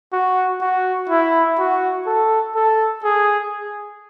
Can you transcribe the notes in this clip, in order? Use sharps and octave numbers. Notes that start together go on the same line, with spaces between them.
F#4
F#4
E4
F#4
A4
A4
G#4